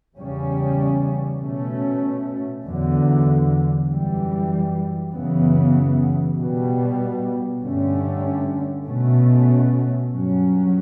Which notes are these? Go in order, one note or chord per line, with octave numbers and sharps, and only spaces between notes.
E2 C#3 G3 C#4
B2 A3 C#4
E2 D3 F#3
F#2 E3 G3
F#2 C#3 E3 B3
B2 G3 B3
G2 D3 A3 C#4
B2 A3 C#4
G2 F#3 C#4